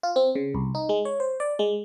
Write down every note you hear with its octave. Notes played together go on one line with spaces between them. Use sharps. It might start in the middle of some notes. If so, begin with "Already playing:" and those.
F4
C4
C#3
C2
D#4
G#3
C#5
C5
D5
G#3